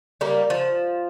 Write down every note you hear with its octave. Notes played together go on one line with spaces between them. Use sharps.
G3 A#3
F3